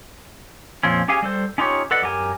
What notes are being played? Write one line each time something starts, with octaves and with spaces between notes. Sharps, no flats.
F2 A#2 F3 C4 C#4
C#4 G4 G#4 F5 G#5
G3 A4 C5
C#4 D#4 F4 G4 B4 C#5
A4 B4 D5 D#5 F#5
F#2 G4 A#4 G#5